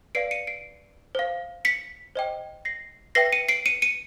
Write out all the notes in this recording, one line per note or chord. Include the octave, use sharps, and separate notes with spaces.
B4 D5 F5 C7 D7
C#7 D#7
C7 D7
C5 F5
B6 C#7
C5 D#5 G5
A#6 C7
B4 E5 G5 A#6 C7
C#7 D#7
C7 D7
C#7 D#7
C#7 D#7